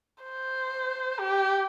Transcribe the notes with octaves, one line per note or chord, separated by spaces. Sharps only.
C5
G4